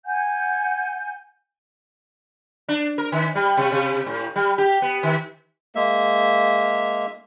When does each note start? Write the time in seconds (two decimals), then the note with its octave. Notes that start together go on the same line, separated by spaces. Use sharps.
0.05 F#5 G#5 G6
2.69 D4
2.98 A#4
3.12 D#3
3.35 G3
3.57 C3
3.72 C3
4.06 A2
4.36 G3
4.58 G4
4.82 B3
5.03 D#3
5.75 G#3 A#3 E5